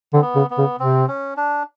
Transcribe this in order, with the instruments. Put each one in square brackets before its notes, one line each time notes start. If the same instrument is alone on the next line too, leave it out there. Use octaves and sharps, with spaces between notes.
[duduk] D3 [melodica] C4
[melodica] B3
[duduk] C#3
[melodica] B3
[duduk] C#3
[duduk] C3 [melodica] C4
[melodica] C#4
D4